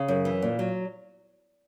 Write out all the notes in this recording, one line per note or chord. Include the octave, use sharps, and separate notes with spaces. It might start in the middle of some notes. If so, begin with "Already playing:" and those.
Already playing: C#3
F#2
E3
A#2
F#3